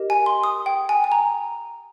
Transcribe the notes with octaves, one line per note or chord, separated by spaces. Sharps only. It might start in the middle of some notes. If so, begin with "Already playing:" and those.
Already playing: G4 A#4 D#5
G#5
C6
D#6
G5
G#5
G#5
A#5